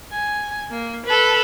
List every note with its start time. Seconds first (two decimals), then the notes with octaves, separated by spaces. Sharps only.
0.12 G#5
0.70 A#3
1.06 A4 B4